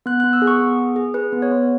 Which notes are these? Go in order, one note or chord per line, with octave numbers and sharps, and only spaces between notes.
B3 F#6
F#6
B3
E6
G#4
C#6
B3
G#4
G#4
G#4 B4
B3
C#5
B3